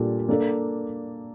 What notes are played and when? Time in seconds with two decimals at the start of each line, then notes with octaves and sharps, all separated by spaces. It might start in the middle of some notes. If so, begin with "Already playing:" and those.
Already playing: A#2 G3 D4 A4
0.29 A#3 D4 A4 D5